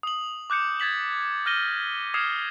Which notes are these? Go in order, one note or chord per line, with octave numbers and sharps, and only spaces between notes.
D#6 F#7
D6 F#6 G6 C#7
G#6 A6 B6 F#7
F6 G6 A#6 D#7 G7
D#6 F6 G#6 C7 C#7 E7